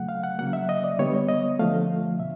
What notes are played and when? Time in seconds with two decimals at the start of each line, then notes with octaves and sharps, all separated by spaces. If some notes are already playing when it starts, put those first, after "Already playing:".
Already playing: C#3 F#3 A3 F#5
0.09 F5
0.24 F#5
0.39 C#3 F#3 A#3 F#5
0.53 E5
0.69 D#5
0.84 D5
0.99 D3 G3 B3 C#5
1.29 D#5
1.59 D3 F3 A3 F5
2.19 B2 E5